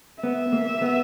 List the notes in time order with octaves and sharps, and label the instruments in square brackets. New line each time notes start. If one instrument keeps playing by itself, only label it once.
[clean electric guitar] B3 [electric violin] E5
[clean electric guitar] A#3
B3